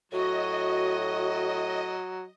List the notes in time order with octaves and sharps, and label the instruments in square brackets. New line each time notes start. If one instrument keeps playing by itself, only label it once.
[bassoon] A2 [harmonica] F#3 [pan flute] F#4 [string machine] D#5